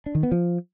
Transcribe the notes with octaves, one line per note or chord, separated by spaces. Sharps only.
D4
D#3
B3
F3